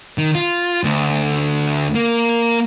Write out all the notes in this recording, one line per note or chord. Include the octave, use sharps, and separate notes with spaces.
D#3
F4
D2
A#3